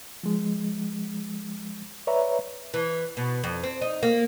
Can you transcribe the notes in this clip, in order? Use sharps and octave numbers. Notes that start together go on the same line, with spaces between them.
F3 G#3
B4 C#5 D5 E5 A#5
E3
B2
F2
C4
D#4
A#3